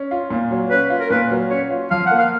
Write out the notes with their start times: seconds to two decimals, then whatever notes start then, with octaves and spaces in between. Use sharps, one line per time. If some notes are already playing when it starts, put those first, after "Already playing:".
Already playing: C#4
0.11 F4
0.30 A#2
0.51 F#3
0.70 C#4 B4
0.90 F4
1.00 A#4
1.10 A#2 B4
1.30 F#3
1.50 C#4 C#5
1.70 F4
1.91 F3 F5
2.07 A#3 F#5
2.19 F5